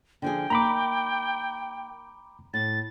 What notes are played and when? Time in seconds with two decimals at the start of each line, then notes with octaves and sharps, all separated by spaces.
0.22 D3 F3 G#4 G5
0.50 A#3 D#4 A#5 B5 D6
2.54 A2 A6